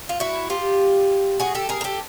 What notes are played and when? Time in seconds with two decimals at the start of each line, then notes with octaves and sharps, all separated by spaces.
0.09 F4
0.20 E4 F#4
0.50 F4 G4
1.40 F#4 G#4
1.55 G4 A4
1.69 G#4 A#4
1.81 A#4
1.84 G4 A4